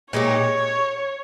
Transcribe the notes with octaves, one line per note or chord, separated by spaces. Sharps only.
A#2 G#3 D#4 G4 C#5